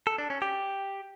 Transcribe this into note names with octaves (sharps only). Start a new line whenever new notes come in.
A4
D4
C#4
G4